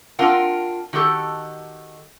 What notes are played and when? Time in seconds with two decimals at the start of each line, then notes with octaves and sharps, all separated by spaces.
0.19 C4 D4 F4 A#4 F5 F#5
0.93 D#3 F#4 G4 A4